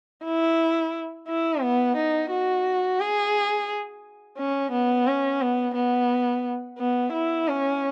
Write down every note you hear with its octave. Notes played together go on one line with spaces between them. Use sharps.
E4
E4
B3
D#4
F#4
G#4
C#4
B3
C#4
B3
B3
B3
E4
C#4